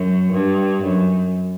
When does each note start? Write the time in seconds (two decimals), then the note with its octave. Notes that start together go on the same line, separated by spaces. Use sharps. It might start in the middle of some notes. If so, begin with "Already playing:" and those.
Already playing: F#2
0.33 G2
0.83 F#2